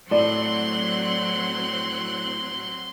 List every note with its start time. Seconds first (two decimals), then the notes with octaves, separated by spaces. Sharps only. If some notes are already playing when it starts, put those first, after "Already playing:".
0.11 A2 F#3 C4 D5 C6 F#6